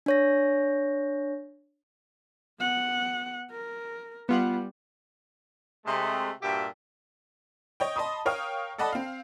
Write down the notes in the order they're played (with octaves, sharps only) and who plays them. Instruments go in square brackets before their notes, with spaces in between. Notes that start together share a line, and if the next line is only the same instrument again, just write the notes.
[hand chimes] D4 C#5 A#6
[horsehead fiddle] B3 F#5
A#4
[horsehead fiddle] G3 [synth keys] B3 F4 F#5
[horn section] C3 G#3 A3
G2 A#2 F#4 G4 E5
[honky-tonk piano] C#5 D#5 G5
D#5 A5 B5 C6 D#6
A#4 C#5 F5 G5 D#6 F6
A4 D5 D#5 F#5 A5 B5
C4 F5